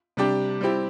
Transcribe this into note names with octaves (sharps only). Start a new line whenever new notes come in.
C3 G3 D4 G4
G3 C4 E4 G4